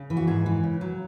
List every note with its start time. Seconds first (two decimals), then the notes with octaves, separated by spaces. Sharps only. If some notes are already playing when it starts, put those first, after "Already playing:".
Already playing: C#3
0.10 E3
0.17 F#4
0.27 G#2 G#4
0.46 E3
0.64 C#3
0.81 F#3